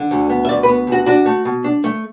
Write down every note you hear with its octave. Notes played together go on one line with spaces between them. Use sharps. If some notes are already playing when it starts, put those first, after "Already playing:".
Already playing: D3
D2
B3
E5
D2 D5
B4
B3
D2 F#4
D4 F#4
A3
B2
D4
A3